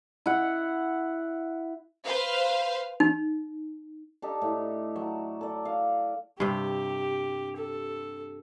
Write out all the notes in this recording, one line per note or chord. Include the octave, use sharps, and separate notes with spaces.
E4 F#5
B4 C5 F5
D#4
D4 D#4 G4 A4
A2
F#3
A4 D5
F5
G2 C3 G4
A4